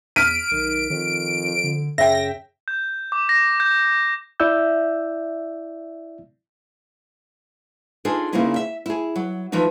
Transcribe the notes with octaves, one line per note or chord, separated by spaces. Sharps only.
E2 F6 B6 D7 D#7
B1 D#3
F2 D#3
D3
F#2 C#3 E5 G5 A#6
G6
D6
A#6
G6
E4 D5 E5 E6 G6
D4 D#4 F4 G#4 A4 C5
C#3 A#3 C4 D#4 E4 G#4
E5
E4 G#4
F#3
E3 F3 A3 D#4